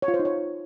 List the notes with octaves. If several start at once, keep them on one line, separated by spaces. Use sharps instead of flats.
C#5
F4
C5
D#4
C#5